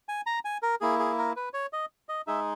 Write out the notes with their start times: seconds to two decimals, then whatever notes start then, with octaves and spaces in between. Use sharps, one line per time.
0.09 G#5
0.26 A#5
0.45 G#5
0.63 A#4
0.81 A#3 E4 G#4
0.99 G#4
1.18 A#4
1.36 B4
1.54 C#5
1.73 D#5
2.09 D#5
2.27 G#3 D#4 G#4 E5